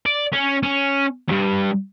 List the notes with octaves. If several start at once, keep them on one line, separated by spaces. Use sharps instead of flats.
D5
C#4
C#4
E2 G2